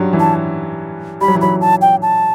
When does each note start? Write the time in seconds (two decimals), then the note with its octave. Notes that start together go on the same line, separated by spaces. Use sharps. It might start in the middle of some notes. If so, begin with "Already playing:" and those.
Already playing: G2 F#3 G3
0.13 E3
0.20 A5
1.21 G3 B5
1.28 F#3
1.35 E3
1.41 F#3 B5
1.61 A5
1.82 G5
2.02 A5